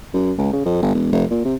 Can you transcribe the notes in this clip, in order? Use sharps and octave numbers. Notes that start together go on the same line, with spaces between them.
F#2
C#2
C#3
F2
G1
E1
F1
A#2
C3